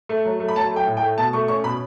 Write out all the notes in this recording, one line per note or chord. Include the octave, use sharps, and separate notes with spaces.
A3
F#3
A3
B5
F#3 A5
A3
G5
A2
G5
A3
B2 A5
A3 C#6
C#4 C#6
B2 B5